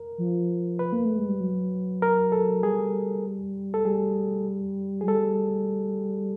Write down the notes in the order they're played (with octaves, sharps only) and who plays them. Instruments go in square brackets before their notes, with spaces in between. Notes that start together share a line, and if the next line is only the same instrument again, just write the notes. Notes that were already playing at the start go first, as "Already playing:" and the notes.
Already playing: [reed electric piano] A#4
[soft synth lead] F3
[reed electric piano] B4
[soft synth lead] A#3
A3
G#3
G3
F#3
[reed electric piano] A#4
A4
[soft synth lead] G3 [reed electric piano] G#4
[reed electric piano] A4
[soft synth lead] G3 [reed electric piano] G#4
[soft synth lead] F#3 [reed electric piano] G#4
[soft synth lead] G3 [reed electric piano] A4